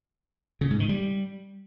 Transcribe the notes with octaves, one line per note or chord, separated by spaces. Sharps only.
C#3
G#2
D#3
G3